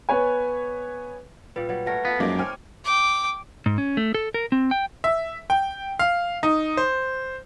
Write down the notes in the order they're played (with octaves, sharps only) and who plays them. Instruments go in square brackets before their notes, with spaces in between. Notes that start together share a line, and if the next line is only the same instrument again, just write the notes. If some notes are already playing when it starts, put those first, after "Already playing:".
[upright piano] B3 B4 C#5 G#5
[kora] A#2 G3 [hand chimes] B4
[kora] F#3 G3 [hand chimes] B4
[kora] A3 A#4 C#5 [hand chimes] B4 F#5 A#6
[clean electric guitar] B3 [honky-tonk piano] F4 A4
[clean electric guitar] F#2 [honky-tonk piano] F3 G#3 A#3 [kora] D#4 [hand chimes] D6
[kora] C4 C#5 [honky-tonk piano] G5 G#5 F6
[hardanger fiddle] G5 D6
[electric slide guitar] G#2
C#4
A3
A4
A#4
C4
G5
[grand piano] E5
G5
F5
D#4
C5